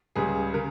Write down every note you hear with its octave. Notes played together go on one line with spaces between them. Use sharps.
C#2 C#3 G3 G#4
C#3 A#4